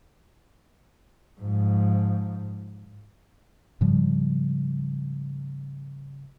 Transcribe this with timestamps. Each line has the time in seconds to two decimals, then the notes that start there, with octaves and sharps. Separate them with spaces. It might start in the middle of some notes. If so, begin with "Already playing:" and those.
1.40 G#2 F3
3.81 G#2 C#3 F3 G3